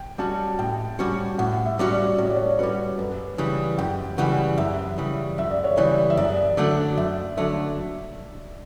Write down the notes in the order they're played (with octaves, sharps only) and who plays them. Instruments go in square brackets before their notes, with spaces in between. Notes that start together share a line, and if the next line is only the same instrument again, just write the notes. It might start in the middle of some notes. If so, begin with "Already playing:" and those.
Already playing: [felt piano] G5
[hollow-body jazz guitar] G3 C#4 F#4 [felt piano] A5
[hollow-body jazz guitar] A2 [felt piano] G5
[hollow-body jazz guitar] G3 C#4 F#4
[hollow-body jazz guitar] A2 [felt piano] F#5
[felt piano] E5
[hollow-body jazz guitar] G3 C#4 F#4
[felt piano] D5
[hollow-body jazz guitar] A2 [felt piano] C#5
[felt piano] D5
C#5
[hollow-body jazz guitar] G3 C#4 F#4 [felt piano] B4
[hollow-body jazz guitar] F#2 [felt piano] B4
[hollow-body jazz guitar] C#3 E3 G3
[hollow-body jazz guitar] F#2 [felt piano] G5
[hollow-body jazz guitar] C#3 E3 G3 [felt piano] F#5
[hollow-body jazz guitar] F#2 [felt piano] E5
[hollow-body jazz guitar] C#3 E3 G3
[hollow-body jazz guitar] F#2 [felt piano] E5
[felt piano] D5
C#5
[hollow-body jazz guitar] C#3 E3 G3 [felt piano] D5
[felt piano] E5
[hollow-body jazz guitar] F#2 [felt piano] D5
[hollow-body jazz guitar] D3 F#3 A3 D4
[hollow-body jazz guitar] F#2 [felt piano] E5
[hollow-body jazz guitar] D3 F#3 A3 D4 [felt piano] E5